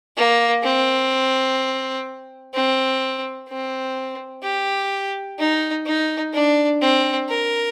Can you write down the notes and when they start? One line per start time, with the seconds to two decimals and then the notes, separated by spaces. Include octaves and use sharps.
0.17 A#3
0.63 C4
2.54 C4
3.49 C4
4.43 G4
5.39 D#4
5.86 D#4
6.33 D4
6.81 C4
7.29 A#4